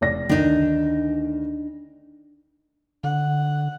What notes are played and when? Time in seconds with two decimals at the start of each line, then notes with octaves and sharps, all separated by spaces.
0.01 F1 D5 A#6
0.29 D2 D#3 D4 D#4
3.04 D3 F#5